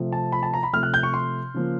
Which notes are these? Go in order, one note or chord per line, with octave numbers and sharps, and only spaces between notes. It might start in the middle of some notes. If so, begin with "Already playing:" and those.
Already playing: C3 F3 A3 C4
A5
B5
A5
A#5
B5
C3 F3 A3 F6
F#6
G6
C#6
C6
C#3 F3 A#3